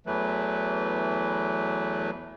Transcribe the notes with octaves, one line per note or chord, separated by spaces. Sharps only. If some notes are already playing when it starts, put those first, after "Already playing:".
E2 E3 F#3 A3 B4